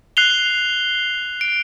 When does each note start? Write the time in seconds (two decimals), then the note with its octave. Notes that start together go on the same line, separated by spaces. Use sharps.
0.17 F#6 C7 F7 G7
1.41 D7